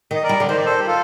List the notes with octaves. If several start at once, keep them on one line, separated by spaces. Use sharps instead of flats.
D#3
D#5
A#4 D5
G3
D3
D#3 C5
D5
A4 C5
G4
F4 A4